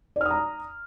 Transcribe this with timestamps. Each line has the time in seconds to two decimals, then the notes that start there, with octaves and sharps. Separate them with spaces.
0.16 D5
0.21 F6
0.26 D#6
0.31 A#5